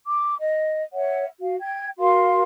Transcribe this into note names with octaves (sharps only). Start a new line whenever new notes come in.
D6
D#5
C#5 E5 F#5
F#4 F5
G5 G#6
F#4 A#4 F5 C6